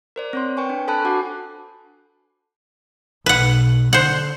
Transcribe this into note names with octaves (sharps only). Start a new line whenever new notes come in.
A#4 C5 D5
C4 C#5 C6
B4 G5 G#5 C#6
D4
A4 C5 G#5 A5 B5 F#6
D4 F#4 F#5 D6
B1 B4 F#5
D3 C5 F#5